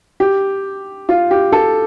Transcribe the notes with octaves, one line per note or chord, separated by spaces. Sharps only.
G4
F4
G4
A4